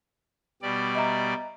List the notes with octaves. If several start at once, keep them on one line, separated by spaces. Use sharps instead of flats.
B2 G3 D5
D#5 E5 A#5